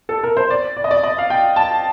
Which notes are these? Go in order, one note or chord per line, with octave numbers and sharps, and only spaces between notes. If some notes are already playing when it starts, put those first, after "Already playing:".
A4
A#4
C5
D5
D5
D#5
D5
D#5
F5
G5
A5